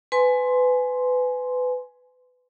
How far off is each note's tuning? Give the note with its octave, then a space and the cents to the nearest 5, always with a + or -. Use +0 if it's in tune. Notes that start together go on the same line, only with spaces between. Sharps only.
B4 +25 G#5 +15 C6 +0